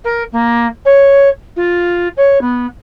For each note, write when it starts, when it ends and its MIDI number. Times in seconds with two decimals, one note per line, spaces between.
0.04 0.23 70
0.32 0.66 58
0.85 1.28 73
1.56 2.08 65
2.16 2.40 73
2.41 2.66 59